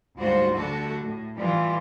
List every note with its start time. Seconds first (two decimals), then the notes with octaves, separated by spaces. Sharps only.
0.17 D2 G#2 G3 F4 F#4 C5
0.56 D3 G3 A3 F#4 A4
1.04 A2
1.39 A2 E3 G3 A3 F4